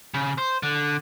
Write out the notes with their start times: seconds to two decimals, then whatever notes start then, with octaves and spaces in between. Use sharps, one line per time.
0.14 C#3
0.38 C5
0.63 D3